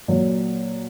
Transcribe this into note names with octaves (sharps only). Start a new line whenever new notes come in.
A#2 F#3 A#3